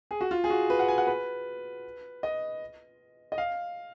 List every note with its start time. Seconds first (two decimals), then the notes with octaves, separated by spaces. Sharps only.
0.11 G#4
0.21 F#4
0.31 F4
0.44 G#4
0.50 F#4
0.70 B4
0.79 F#5
0.88 G#5
0.98 F#5
1.07 B4
2.23 D#5
3.32 D#5
3.38 F5